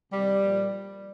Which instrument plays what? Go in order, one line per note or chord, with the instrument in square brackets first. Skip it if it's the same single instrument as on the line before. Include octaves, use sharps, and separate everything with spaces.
[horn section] C3 D#3 G3
A#2 F3